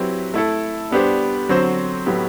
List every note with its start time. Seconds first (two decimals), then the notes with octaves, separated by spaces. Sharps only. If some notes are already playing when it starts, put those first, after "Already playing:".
Already playing: F#3 C4 E4 G4 B4
0.34 A3 E4 A4
0.91 G3 B3 D4 G4 C5
1.49 D3 F#3 C4 F#4 C5
2.06 A2 F#3 B3 E4 G4